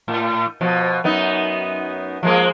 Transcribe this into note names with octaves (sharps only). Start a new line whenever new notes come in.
A2
B2 F3
F#2 B3 D#4
F3 G#3 A#3